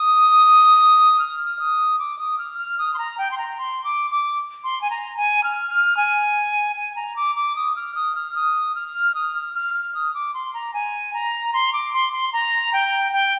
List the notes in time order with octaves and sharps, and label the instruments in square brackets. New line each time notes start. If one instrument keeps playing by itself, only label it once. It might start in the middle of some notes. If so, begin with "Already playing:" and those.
Already playing: [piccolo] D#6
F6
D#6
D6
D#6
F6
F6
D#6
C6
A#5
G5
C6
A#5
C6
D6
D6
C6
G#5
A#5
G#5
F6
F6
G#5
G#5
A#5
D6
D6
D#6
F6
D#6
F6
D#6
F6
D#6
F6
F6
F6
D#6
D6
C6
A#5
G#5
A#5
C6
D6
C6
C6
A#5
G5
G5